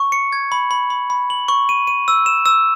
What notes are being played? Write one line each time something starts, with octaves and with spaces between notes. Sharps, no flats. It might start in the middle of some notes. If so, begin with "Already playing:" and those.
Already playing: C#6
C#7
G#6
B5
B5
B5
B5
F#7
C#6
D#7
D#7
E6
E7
E6